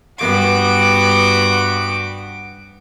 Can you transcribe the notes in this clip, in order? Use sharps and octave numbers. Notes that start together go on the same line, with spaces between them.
G2 B3 F#4 D6